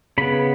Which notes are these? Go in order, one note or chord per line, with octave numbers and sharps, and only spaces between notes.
C#3 B3 B5